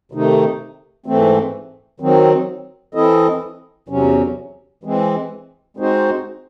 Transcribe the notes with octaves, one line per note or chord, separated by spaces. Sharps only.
C3 D#3 A3 D#4
G#2 E3 A3 C4
D#3 F#3 C4
E3 C4 E4 A4 D#5
E2 C3 F#3 C#4
E3 G#3 C4
G#3 C4 D#4 F#4 C5